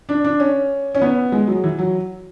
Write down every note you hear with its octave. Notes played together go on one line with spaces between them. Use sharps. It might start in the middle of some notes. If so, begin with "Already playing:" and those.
D4
D4
C#4
C#4
B3
G#3
F#3
E3
F#3